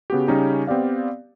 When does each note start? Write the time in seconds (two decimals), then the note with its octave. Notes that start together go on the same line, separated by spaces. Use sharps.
0.10 C#3 B3 F#4 G4
0.27 C#3 G3 C#4 D#4 G4
0.67 B3 C4 G4 D5 F5